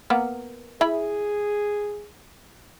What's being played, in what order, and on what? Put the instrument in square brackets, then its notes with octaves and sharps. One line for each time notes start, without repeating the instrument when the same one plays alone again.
[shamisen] A#3 B3 A#4
[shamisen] E4 E5 B5 [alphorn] G#4